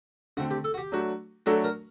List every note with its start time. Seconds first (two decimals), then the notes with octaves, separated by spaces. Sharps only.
0.37 D3 A3 C4 F#4
0.51 G4
0.64 A4
0.74 F#4
0.78 G4
0.92 F#3 A3 D4 F#4
1.46 F#3 A3 D4 F#4 A4
1.64 A#4